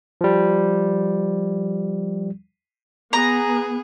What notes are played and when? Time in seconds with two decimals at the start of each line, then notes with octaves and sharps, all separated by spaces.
0.21 F3 G3
3.13 B3 G#4 A#5